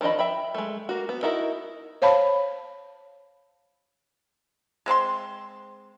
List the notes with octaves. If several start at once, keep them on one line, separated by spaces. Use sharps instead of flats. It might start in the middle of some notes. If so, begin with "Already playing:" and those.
D#3 F3 D4 D#5 B5
E5 G5 B5
G#3 A3
A#3 F#4
B3
D#4 E4 F#4 A#4
C5 C#5 F5 A5 B5
G#3 C4 B4 C6